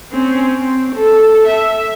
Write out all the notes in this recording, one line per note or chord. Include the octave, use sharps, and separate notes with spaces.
C4 C#4
C4
A4
E5